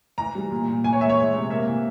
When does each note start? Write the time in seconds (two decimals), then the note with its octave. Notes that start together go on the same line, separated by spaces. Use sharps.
0.18 E3 A#5
0.35 G3
0.51 A#2
0.68 A#2
0.84 E3 G#5
0.93 C#5
1.01 G#3 E5
1.09 C#5
1.17 G#3
1.34 C3
1.50 A#3 E5
1.68 E3